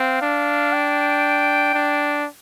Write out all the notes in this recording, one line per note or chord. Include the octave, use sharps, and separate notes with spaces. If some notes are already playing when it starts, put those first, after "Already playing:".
Already playing: C4 F5
D4
G5
D4